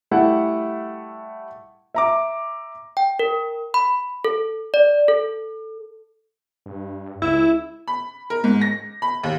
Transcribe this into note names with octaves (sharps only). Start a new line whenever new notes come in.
G3 A3 E4 F#5
E5 A#5 D6
G5
A#4
B5
A4
D5
A4
G2
C#2 E4
B5
A#4
G#2
A#6
B5
D#2